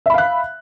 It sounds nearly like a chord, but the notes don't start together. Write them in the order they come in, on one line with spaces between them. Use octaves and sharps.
E5 B5 F5 F#6